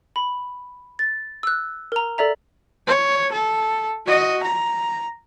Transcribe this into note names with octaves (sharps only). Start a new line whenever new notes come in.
B5
A6
E6 F#6
A#4 A#5
A4 D5 E5 A#5
C#5
A4
F#4 D#5
A#5